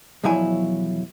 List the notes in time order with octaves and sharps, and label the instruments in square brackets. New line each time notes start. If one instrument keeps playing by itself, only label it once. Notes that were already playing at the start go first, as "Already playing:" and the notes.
[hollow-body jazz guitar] B1 E2 F3 F#3 E4 G#5